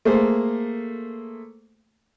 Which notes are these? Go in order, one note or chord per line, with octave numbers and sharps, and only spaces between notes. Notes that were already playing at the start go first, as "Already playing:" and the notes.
A3 A#3 G#4 C5